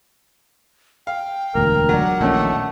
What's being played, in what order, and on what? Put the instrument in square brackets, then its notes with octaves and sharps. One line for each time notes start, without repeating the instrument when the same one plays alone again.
[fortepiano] F5 [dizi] G5
[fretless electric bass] E1 D2 A#2 [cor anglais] A#4
[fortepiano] F#3 D4 [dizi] F#5
[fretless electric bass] A#1 A#2 C#4 [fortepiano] D#2 [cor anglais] A3